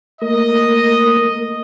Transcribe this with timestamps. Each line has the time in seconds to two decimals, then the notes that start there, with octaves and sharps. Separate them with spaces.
0.22 A3 A#3 A#4 D#5